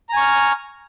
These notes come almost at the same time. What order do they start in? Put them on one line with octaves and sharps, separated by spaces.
A#5 G#5 C#6 F6